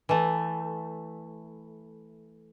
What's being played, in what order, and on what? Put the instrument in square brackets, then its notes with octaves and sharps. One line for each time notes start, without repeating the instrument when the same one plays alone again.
[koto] E3 A3